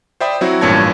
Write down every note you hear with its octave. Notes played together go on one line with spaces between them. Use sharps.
C5 D5 E5 G5 B5 D#6
F#3 C4 E4 F#4
A1 G2 A#2 C#5 A5 G#6